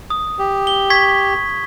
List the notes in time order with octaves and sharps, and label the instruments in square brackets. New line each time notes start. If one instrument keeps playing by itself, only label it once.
[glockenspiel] D#6
[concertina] G4
[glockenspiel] G7
C#6 G#6 B6